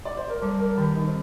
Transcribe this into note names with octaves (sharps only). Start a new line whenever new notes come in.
D5
C5
A#4
G3 A4
A#4
D#3 G4
D#4
C4